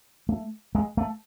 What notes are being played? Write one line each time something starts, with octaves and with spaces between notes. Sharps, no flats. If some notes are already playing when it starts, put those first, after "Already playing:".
A3
G#3
A3